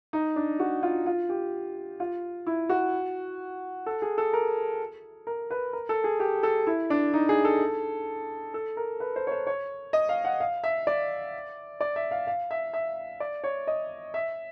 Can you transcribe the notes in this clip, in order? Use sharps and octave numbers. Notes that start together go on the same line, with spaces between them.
D#4
D4
F#4
F4
F4
G4
F4
E4
F#4
A4
G#4
A4
A#4
A#4
B4
A#4
A4
G#4
G4
A4
E4
D4
D#4
G#4
A4
A4
A#4
B4
C5
C#5
C5
C#5
D#5
F5
F#5
F5
E5
D5
D5
E5
F5
F5
E5
E5
D5
C#5
D#5
E5